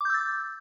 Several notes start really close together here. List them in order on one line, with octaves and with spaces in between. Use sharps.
D6 G6 E6 A6